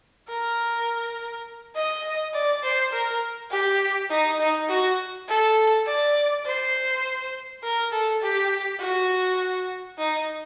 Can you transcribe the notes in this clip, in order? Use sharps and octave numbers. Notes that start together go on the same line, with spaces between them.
A#4
D#5
D5
C5
A#4
G4
D#4
D#4
F#4
A4
D5
C5
A#4
A4
G4
F#4
D#4